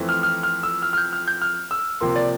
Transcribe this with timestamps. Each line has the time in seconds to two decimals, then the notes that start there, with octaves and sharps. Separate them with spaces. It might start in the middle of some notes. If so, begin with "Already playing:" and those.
Already playing: F2 E3 A3 C4
0.09 F6
0.23 F6
0.43 F6
0.63 E6
0.82 F6
0.93 F6
0.97 G6
1.13 F6
1.28 G6
1.42 F6
1.71 E6
2.01 C3 F3 A#3 C6
2.16 D5